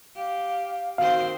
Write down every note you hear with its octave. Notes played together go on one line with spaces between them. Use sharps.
G4 F5
D#3 C4 F#4 C5 F5